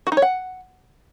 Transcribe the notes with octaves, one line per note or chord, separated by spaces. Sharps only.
F#4
D#4
C#5
F#5